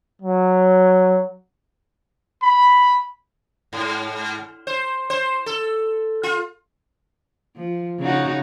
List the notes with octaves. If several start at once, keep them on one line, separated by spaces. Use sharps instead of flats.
F#3
B5
G#2
C5
C5
A4
F4
F3
C#3 D#4 F#4